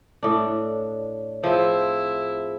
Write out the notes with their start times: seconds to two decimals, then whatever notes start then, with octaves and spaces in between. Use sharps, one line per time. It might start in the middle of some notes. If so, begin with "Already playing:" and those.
0.23 A2 D4 C#5 D5
1.44 F3 C4 E4 G#4